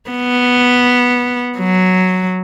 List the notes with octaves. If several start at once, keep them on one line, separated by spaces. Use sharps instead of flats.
B3
F#3